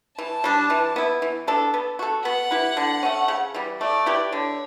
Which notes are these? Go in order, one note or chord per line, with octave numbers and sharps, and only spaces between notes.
E3 A5
G3 D4
E3
B3 E4
E3
B3 D4 A4
B3
F#4 A4
B3 F#5
E4 G4 B4
D3
A3 C#4
C#3
E3 G3
A3 D5
E4 G4 B4
D3 C#5